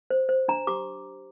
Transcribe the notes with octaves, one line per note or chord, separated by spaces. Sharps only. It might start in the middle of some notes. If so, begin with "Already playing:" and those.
C5
C5
D4 A#5
G4 D6